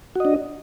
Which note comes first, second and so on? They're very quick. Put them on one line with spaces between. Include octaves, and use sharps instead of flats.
F#4 D#5 D4